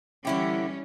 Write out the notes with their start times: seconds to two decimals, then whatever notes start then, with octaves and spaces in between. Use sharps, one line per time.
0.25 D3 E3 G3 C#4 E4 G4